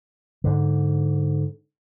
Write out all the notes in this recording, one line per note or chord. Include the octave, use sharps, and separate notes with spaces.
G#2 D3